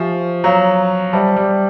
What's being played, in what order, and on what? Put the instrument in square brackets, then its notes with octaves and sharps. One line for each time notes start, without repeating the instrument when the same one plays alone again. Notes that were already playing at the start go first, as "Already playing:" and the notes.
Already playing: [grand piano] F3 [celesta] G4 C5 E5 G#5 C#6
[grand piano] F#3 [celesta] C#5 F5 A#5 C#6
[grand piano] G3 [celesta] C5 E5 A5
[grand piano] G3